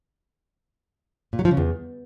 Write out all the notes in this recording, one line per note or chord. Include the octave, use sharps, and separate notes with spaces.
A#2
F#3
F3
C#3
E2